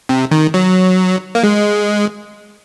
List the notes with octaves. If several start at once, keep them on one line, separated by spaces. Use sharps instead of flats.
C3
D#3
F#3
A#3
G#3